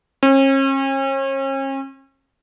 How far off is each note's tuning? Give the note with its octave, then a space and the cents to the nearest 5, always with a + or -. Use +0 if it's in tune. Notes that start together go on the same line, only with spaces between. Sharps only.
C#4 -40